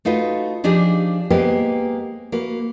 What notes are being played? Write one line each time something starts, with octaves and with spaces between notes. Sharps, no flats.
A3 D#4 F4 F#4 B4
F3 D4 D#4 G4 G#4
G#3 A#3 B3 G4 B4 C5
A#3 F#4 B4